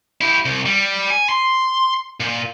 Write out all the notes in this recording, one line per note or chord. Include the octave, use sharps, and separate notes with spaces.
E4 G4
C2
G3
G#5
C6
A#2